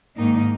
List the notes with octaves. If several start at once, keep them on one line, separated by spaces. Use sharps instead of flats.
G#2 D#3 A#3 D#4